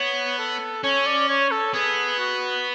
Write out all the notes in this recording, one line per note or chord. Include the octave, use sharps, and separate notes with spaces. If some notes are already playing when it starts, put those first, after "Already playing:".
Already playing: B3 C#5
A4
C#4 C#5
D5
C#5
A4
B3 G#4
F#4